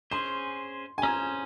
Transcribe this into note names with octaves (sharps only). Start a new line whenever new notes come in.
C#4 G#4 C5 C6
G#5
C#4 G#4 C5 A#5